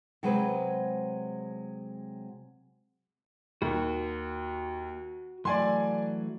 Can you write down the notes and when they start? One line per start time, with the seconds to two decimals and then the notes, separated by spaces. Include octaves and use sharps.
0.23 C3 F#3 G#3 C4 B4
3.62 D#2 F#4 C#6
5.45 E3 F#3 A3 D5 G#5 C6